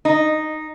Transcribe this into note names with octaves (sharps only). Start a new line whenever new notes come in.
D#4